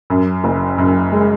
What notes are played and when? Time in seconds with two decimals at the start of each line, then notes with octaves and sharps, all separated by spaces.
0.10 F#2
0.44 F#1
0.78 F#2
1.13 G#3